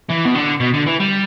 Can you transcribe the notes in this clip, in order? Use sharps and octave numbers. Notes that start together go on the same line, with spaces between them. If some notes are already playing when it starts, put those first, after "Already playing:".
E3
B2
D3
B2
D3
E3
G3